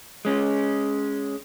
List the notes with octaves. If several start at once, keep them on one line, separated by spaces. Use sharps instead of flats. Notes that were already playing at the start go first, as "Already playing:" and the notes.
G#3 C#4